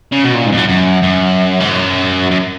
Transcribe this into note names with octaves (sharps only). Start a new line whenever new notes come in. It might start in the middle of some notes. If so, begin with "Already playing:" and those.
C#3
B2
A#2
G#2
F2
F#2
F#2
F#2
G#2
F#2
F#2